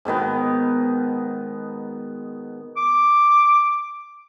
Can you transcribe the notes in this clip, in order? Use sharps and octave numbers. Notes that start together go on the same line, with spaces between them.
G#2 B2 D#3 B3
D6